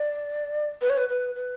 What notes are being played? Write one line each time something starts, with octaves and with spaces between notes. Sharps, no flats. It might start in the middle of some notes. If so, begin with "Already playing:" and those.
Already playing: D5
B4
C#5
B4
B4
B4